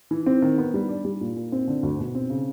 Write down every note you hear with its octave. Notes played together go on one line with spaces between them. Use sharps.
E3
C4
D#3
B3
G3
D4
G3
A#2
A#2
C4
D3
D2
B2
C4
C#3